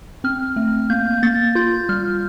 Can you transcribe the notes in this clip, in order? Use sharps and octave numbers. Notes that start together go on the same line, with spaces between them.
C4 F6
A3
A#3 G6
A#3 A6
F4 G6
G3 F6